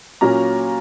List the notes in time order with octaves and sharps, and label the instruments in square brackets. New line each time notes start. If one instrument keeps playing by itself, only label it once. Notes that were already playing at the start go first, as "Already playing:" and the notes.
[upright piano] A#2 F#3 A#3 C#4 A#5